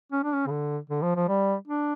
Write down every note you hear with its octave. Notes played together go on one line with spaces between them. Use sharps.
C#4
D4
C#4
C#3
D3
D3
F3
F3
G3
D4